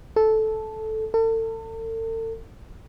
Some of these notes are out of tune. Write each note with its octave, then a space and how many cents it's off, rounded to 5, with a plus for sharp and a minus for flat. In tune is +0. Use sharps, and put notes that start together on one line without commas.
A4 -10
A4 +40